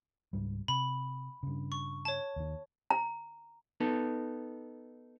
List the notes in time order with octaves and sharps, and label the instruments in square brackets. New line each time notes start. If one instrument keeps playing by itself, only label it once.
[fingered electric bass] C#2 G#2 G3
[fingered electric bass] C3 [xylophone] B5
[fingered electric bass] G2 C#3
[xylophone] C#6
C#5 A5
[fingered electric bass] D#2 D#3
[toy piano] A#5
[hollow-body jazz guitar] B3 D#4 A4